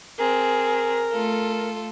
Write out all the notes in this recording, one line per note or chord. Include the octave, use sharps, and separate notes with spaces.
C4 G#4 A#4
A3 F4 A4